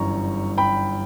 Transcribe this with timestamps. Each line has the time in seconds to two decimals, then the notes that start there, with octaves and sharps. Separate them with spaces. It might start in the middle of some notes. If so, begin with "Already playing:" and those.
Already playing: G1 F#2 E3 G3 A#5 C#6
0.58 G5 B5